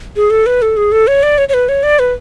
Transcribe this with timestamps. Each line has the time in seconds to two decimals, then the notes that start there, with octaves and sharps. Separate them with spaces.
0.16 G#4
0.30 A4
0.46 B4
0.62 A4
0.77 G#4
0.92 A4
1.07 C#5
1.23 D5
1.38 C#5
1.49 C#5
1.54 B4
1.69 C#5
1.83 D5
1.99 B4